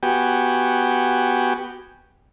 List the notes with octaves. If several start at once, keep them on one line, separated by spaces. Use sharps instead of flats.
B3 F#4 G4 G5 G#5